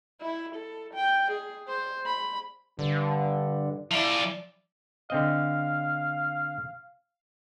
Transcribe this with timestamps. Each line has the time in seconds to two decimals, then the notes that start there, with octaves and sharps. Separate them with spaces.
0.21 E4
0.55 A4
0.94 G5
1.31 G#4
1.68 C5
2.06 B5
2.79 G2 D3
3.91 F3 E4 D5
5.10 D3 C4 D#5 F5